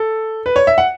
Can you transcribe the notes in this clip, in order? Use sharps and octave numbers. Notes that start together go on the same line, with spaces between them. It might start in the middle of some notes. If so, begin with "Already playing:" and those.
Already playing: A4
B4
C#5
E5
F#5